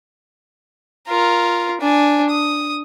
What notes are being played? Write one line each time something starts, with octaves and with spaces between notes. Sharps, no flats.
F4 A#4
D4 G#5
D#6